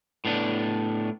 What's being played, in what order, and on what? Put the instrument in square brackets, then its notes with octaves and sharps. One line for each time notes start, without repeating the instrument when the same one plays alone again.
[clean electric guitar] A2 B3 D4